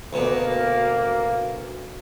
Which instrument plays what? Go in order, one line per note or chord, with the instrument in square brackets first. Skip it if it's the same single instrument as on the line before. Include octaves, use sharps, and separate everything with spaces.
[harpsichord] D2 B2 [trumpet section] A#3